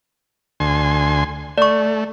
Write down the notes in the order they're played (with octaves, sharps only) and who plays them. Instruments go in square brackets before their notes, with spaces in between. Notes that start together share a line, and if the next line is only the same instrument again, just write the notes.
[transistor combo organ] D2 G#5 C6
[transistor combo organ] A3 [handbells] D5 C#6